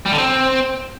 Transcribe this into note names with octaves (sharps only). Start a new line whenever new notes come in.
G3
D3
C4